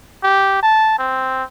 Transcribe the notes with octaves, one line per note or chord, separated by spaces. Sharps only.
G4
A5
C4